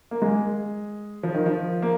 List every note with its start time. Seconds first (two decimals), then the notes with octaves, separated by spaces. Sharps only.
0.11 A#3
0.22 G#3
1.23 F3
1.34 D#3
1.46 F3
1.82 A#3